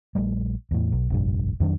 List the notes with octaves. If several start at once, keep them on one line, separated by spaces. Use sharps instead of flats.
A#1 G3 A3
E2 A2
B1
F1 A#1 G2
F2 D#3 F#3 D4